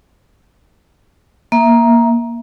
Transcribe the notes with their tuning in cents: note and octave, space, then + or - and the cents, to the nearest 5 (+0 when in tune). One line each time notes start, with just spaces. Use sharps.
A#3 +10 E5 +0